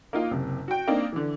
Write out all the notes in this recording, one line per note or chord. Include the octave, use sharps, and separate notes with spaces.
A#3 D#4 F4
F#1 C3
F#4 G5
A#3 C4 D4 D#4
D3 E3